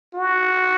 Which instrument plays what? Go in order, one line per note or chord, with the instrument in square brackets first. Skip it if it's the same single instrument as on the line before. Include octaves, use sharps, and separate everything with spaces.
[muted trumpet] F#4